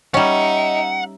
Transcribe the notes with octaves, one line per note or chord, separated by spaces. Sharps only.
G3 C#4 D#4 D#5 E5 F#5